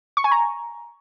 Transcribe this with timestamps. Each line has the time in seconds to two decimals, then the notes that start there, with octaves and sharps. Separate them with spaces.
0.17 C#6
0.24 G#5
0.32 A#5